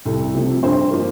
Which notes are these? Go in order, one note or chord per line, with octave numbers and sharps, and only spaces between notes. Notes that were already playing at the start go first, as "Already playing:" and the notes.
C2 A4
C3 F3 A3
G2 C5
F3 A#3